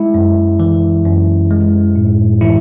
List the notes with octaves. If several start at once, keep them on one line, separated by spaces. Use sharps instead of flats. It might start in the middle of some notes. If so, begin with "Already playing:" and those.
Already playing: G#3 E4
F#2
E3
F#2
G#3
A2
E3 E4